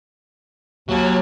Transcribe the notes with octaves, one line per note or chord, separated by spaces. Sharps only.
D#2 F#3